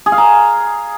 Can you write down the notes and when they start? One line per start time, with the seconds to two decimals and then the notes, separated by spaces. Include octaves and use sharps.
0.06 G#4
0.12 F5
0.18 A#5